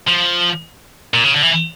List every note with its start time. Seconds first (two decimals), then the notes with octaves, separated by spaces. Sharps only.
0.07 F3
1.14 A#2
1.24 C#3
1.34 D3
1.42 E3